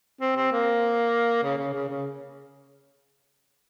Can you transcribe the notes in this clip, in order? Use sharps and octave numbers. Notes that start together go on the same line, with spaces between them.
C4
C4
A#3
C#3
C#3
C#3
C#3